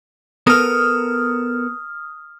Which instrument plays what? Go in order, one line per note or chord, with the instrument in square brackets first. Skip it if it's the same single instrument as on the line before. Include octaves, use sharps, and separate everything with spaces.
[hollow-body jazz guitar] B3 A4 A#4 [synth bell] D#6 F6